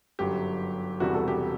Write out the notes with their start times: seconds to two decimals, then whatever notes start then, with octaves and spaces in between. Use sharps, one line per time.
0.19 G1 F#2 F#3 G4
1.00 E1 E2 C3 G3 F#4
1.14 F#4 A4
1.28 G4